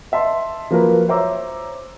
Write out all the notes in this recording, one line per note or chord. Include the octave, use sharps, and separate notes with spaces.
D#5 E5 A5 C6
F3 F#3 A#3 F4 A#4 B4
C5 C#5 E5 A#5 D6 E6